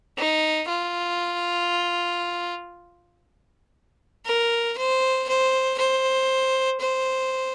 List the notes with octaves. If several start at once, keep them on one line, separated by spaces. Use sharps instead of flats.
D#4
F4
A#4
C5
C5
C5
C5